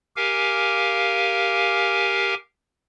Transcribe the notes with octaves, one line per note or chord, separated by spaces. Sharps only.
G4 A#4 F5 G#5